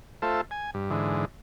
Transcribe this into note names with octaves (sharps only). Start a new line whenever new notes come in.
A3 F4 A4 C5 E5
G#5
G2
G#2 D3 E3